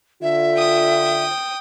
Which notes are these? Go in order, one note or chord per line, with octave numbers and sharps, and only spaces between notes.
D3 F4 E5
G5 D#6